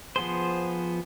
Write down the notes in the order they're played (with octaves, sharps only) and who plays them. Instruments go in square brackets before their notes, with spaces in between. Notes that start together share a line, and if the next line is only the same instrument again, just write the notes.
[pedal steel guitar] F3 B3 G#4 C5